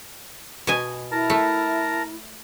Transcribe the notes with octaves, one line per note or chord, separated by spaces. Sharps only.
B2 D#5 G#5
E4 A#4 A5 A#5
A3